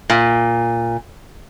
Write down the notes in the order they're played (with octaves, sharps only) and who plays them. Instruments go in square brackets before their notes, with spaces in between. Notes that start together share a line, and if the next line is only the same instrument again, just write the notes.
[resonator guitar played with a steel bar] A#2